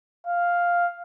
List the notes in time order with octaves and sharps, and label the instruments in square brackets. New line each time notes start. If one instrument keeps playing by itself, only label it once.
[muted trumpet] F5